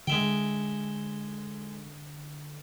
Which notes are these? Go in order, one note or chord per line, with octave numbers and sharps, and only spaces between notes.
D3 G#3 E5 G5